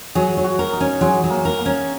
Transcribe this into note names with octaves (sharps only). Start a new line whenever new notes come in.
F#3 G#4
F#3
F#4
A#4
D#4
C#4
F#3 G#3
F#3
A#3
A#4
A#3
C#4